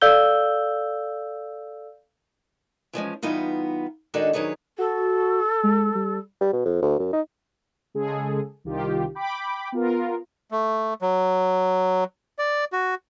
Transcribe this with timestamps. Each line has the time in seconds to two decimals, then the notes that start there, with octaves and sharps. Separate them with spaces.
0.01 A4 D5 F5 E6 G6 G7
2.93 E3 F3 G#3 C#4
3.23 E3 G3 B3 D#4 F4
4.14 D#3 G#3 D4 D#4 F#4 A4
4.33 D#3 F#3 G#4 B4 C#5
4.78 F#4 A4
5.63 G#3
5.95 G3
6.41 G3
6.53 B2
6.65 F2
6.82 D2
6.99 F#2
7.13 D#4
7.94 C#3 G#3 G#4 A4
8.64 C2 D#3 F4 G4
9.15 G5 B5 D6
9.72 B3 F4 A#4
10.51 A3
11.02 F#3
12.39 D5
12.73 F#4